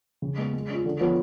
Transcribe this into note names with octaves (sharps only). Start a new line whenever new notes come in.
C#3
G#3 B3
G#3
C#4 F4
D3
F3 B3 F#4 C#5